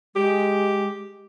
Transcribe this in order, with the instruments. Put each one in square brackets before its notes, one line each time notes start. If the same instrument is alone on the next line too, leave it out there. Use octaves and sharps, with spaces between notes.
[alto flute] G#3 [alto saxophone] G4